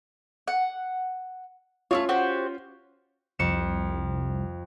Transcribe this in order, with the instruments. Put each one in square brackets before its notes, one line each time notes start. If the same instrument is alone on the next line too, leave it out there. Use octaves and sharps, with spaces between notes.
[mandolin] F#5
[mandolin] A3 B3 C#5 [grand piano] C#4 F4
[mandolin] F#4 G4 C5
[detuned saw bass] C2 [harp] F2 C#7 E7